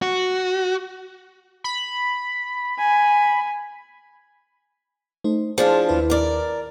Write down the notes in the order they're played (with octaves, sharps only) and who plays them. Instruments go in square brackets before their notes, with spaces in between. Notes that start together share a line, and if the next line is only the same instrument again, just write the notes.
[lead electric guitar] F#4
[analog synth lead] B5
[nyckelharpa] G#5
[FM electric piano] A3 D#4 C5
[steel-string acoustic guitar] F3 D4 F4 [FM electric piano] G#4
[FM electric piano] D#2 E4 B4
[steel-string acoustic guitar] A#4 D5